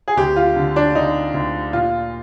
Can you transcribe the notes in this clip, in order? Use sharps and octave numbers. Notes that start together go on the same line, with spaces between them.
G#4
D2 G4
F4
D3
D4
D3 D#4
D2
A#2 F4